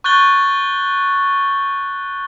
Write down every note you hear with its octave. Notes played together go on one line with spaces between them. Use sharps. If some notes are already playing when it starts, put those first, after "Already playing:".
C#6 F#6 G6 A6 G7